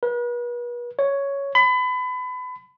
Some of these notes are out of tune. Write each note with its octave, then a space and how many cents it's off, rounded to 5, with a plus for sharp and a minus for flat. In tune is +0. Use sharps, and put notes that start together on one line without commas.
B4 -40
C#5 +5
B5 +30